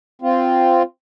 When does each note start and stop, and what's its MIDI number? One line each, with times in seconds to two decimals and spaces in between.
0.22 0.82 60
0.22 0.82 65